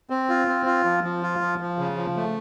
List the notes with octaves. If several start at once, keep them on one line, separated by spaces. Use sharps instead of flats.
C4
F4
C4
F4
F3
F3
F4
F3
F3
C#3
F3
A3